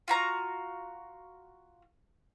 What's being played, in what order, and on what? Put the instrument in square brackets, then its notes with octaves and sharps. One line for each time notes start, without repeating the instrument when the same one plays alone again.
[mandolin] F4 F#4 A#5